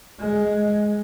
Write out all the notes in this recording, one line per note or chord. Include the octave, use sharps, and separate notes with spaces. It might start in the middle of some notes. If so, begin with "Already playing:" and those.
G#3